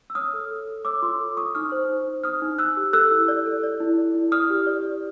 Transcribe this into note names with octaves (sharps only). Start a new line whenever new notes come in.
E6
C#5 D#6 F6
A4
A4
A4
C#5 D6 E6
F4 C6 D6
A4
F4 C#6 D#6
D#4 D#6 F6
C5
D#4
D#4
D#4 D#6 F6
D#4
D#4 E6 F#6
G4
A4 E6 F#6
E4
D5
A4
D5
E4
D5
E4
D5 D#6 F6
G4
D5
D5